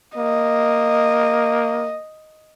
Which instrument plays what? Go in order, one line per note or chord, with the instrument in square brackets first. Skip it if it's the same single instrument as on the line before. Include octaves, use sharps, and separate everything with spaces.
[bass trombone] A#3 [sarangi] D#5